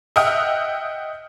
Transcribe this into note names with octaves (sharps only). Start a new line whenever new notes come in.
D#5 E5 F#5 G5 D#6 F6